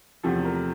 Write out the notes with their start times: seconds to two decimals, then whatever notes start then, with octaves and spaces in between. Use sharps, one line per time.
0.23 E2 C3 F3 A3 A4
0.45 A#4